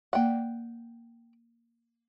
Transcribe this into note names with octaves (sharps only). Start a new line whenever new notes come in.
A#3 D5 F#5 G5